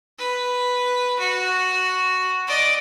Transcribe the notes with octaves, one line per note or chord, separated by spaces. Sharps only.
B4
F#4
D5 D#5